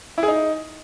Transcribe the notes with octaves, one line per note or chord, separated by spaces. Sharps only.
E4
G#4
D#4